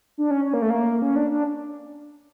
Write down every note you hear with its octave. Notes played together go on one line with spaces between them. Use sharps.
D4
C#4
C#4
A#3
A3
A#3
C#4
D4
D4